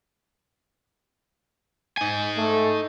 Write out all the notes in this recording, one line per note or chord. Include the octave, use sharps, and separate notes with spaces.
D#4 G#5
A3